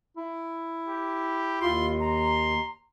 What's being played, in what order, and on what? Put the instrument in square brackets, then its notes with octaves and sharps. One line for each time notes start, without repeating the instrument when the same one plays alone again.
[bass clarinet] E4
[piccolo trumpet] G4
[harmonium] D#2 [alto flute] F4 [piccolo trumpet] C6
[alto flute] A#5 [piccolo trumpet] C6